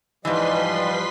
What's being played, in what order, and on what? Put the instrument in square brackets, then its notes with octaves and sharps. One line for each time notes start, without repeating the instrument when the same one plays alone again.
[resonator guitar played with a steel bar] G#2 E3 [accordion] F3 G3 [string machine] B4 C6 B6 [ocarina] D#5